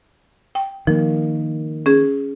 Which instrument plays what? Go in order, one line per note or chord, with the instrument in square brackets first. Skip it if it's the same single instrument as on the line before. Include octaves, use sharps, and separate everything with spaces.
[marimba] G5
[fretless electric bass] D#3 A#3 [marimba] F3
[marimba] C#4 G#4